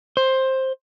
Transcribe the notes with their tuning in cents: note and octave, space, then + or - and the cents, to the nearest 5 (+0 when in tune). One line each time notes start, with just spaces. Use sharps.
C5 +10